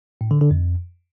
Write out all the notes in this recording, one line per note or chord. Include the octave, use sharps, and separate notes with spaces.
A2
D3
D3
F2